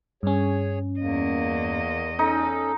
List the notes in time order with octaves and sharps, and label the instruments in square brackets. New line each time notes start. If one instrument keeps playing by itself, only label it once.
[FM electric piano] G2 C#4 [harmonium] G#4 C#5
[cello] E2 D#5 [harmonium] A#3
[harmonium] C#4 A4 [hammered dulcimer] D#4